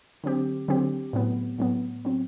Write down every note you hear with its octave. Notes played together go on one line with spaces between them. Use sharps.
D3 F#3 C4 G4
D3 F#3 C4 G4
A2 F#3 B3
A2 F#3 B3
F#3 C4